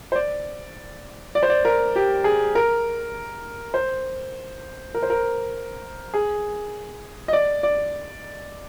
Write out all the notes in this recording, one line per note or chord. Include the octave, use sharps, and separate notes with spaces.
C5
D5
D5
C5
D5
A#4
G4
G#4
A#4
C5
A#4
C5
A#4
G#4
D#5
D5
D5